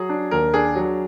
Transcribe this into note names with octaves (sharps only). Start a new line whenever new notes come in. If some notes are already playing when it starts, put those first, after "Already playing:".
Already playing: F#3 G#4
D4
D#2 A#4
D4 G#4
F#3